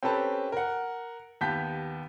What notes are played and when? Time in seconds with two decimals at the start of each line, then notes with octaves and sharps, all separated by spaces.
0.03 C4 C#4 G4 A4 B4 A5
0.52 A#4 F#5
1.41 D#2 B3 G4 A5 G6 B6